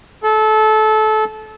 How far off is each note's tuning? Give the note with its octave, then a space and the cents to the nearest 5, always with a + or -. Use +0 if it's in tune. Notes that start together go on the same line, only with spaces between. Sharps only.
A4 -25